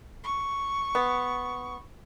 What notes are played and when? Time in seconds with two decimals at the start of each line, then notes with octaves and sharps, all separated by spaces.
0.24 C#6
0.95 B3